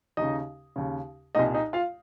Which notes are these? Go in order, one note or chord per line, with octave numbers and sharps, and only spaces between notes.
D#2 C#3 D#4 D#5
D#2 C#3
C2 A#2 D#4 D#5
D#4 D#5
F4 F5